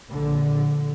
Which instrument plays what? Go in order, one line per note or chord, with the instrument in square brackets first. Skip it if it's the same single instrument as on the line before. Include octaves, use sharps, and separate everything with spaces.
[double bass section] A#1 D3